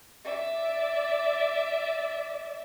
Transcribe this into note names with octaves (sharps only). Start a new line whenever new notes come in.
D5 E5